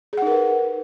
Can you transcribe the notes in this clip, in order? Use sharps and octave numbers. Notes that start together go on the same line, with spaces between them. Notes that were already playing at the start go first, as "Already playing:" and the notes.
D#4 G#4 A#4 B4 F#5